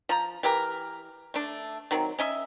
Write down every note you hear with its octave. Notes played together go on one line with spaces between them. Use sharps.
F3 A#5
E3 G4 A#4
A3 D4
D#3 F#3 C4
C#4 D#5 E5